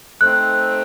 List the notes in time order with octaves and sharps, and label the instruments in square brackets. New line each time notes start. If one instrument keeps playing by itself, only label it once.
[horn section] A3 C4 D#4 [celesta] F#6